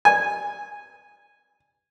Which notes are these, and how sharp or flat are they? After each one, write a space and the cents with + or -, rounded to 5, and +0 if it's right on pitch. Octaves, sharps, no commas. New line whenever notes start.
G#5 -10